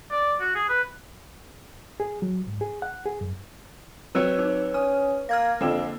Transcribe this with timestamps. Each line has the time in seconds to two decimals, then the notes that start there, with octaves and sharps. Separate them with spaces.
0.11 D5
0.40 F#4
0.55 G#4
0.69 B4
2.00 G#4
2.22 F#3
2.47 G#2
2.61 G#4
2.82 F#5
3.06 G#4
3.21 F#2
4.15 F#3 C4 B4 C#5 E6
4.39 D#4
4.74 C#4 D#6 F6
5.29 A#3 F6 G#6 A#6
5.61 F2 D3 A#3 C4 F4 G5 E7